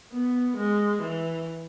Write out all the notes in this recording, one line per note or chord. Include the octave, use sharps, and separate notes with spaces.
B3
G#3
E3